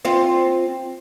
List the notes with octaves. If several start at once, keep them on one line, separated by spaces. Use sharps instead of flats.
C4 F4